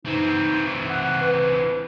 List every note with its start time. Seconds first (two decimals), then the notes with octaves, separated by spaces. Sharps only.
0.05 E3 C4 D#4
0.90 F#5
1.21 B4